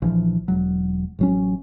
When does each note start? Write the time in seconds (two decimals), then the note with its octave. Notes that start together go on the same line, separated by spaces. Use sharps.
0.02 A#1 E3 F3
0.48 E1 F#3
1.19 A1 F#3 C#4